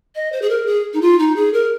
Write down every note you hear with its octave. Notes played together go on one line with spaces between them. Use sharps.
D#5
C5
G#4
A#4
G#4
D#4
F4
D#4
G#4
A#4